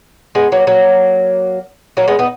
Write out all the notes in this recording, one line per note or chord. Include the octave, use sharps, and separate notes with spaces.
G#3 B3
F#3 A#3
F#3 A#3
F#3 A#3
G#3 B3
B3 D#4